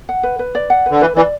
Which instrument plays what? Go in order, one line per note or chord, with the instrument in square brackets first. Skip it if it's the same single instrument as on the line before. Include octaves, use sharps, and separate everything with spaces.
[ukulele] F#5
B4
B4
D5
F#5
[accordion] D3 [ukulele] B4
[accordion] E3 [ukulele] B4
[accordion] E3 [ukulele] D5